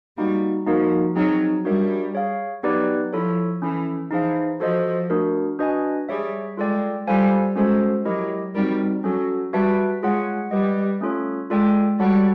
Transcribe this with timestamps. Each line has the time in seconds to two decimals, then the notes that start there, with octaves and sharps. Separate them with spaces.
0.17 G3 A#3 D#4 F#4
0.67 F3 A#3 D#4 F#4 A#4
1.15 F#3 C4 D#4 G#4 C#5
1.65 G3 D4 F#4 A#4 C#5 E5
2.14 G#4 C#5 F5
2.63 F#3 B3 D#4 G4 B4 D5
3.13 F3 E4 A4 C#5
3.62 E3 C#4 E4 A4
4.11 E3 D#4 G#4 C5 F5 A5
4.60 F3 F#4 A4 C5 D#5
5.10 A3 D4 F#4 A#4
5.59 D4 F#4 B4 D#5 G#5
6.09 G3 G#4 C#5 E5
6.57 G#3 F4 A4 D5 G5
7.07 G3 F4 A4 C5 F5 G#5
7.56 G#3 C#4 F#4 A4 C5
8.05 F#3 E4 G4 A#4 D#5
8.54 G3 C4 D#4 F#4 A#4
9.04 F#3 C#4 F#4 A4
9.53 G3 F#4 B4 E5 A5
10.02 G#3 F4 G#4 C#5 F#5
10.51 G3 G4 B4 D#5
11.01 A3 C#4 F4 A4 C#5
11.50 G#3 F4 A4 D5 G5
11.99 G3 F#4 A4 C#5 F#5 A5